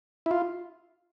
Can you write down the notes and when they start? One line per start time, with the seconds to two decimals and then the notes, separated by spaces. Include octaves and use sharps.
0.26 E4
0.31 F4